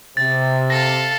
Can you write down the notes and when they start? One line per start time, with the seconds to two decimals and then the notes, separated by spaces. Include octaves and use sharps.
0.17 C3 A6
0.70 A4 F5 A#6